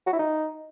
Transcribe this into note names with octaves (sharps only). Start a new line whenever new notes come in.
F#4
E4
D#4